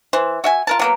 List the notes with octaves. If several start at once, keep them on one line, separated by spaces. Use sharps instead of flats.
E3 C5
F#4 E5 G#5
F4 A#4 A5
F#3 A#3 B3